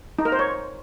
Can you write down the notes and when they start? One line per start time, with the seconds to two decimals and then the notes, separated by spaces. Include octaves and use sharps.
0.19 D#4
0.25 A#4
0.32 C5
0.39 C#5